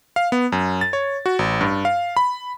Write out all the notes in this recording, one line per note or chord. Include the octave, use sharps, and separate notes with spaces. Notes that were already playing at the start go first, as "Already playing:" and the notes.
F5
B3
F#2
A6
C#5
F#4
A1
G2
F5
B5